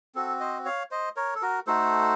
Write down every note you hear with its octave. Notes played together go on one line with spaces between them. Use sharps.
C4 F#4 A4
C5 D#5
C#5 F5
C5 D#5
A#4 C#5
A4
F#4 A#4
A3 D#4 F#4 A4 C5